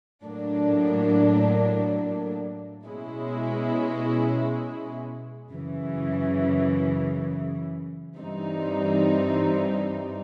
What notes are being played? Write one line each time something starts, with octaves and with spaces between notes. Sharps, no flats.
A2 F#3 A#3 D4
B2 G#3 C#4 E4
F#2 C#3 E3
G2 E3 G3 C4 D#4